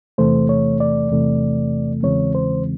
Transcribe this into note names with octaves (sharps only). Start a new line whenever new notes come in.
E2 C3 E3 A3 C5
C#5
D5
E2 C3 E3 A3
E2 C#3 E3 G#3 C4 C#5
C5